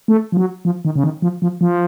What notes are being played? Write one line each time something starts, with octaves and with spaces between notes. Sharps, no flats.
A3
F3
F#3
F3
D#3
C#3
D#3
F3
F3
F3